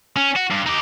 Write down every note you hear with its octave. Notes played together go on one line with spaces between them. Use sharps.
C#4
F#4
G2
D#4 G4